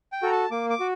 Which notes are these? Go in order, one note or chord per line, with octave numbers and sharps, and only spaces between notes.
G5
F#4 A4 A#5
A5
A#3 D6
D6
F#4